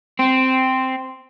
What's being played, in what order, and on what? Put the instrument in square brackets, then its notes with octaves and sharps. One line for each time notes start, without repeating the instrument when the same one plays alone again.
[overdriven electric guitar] C4